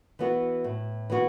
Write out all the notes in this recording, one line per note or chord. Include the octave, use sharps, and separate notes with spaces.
E3 B3 F#4
A2
E3 B3 F#4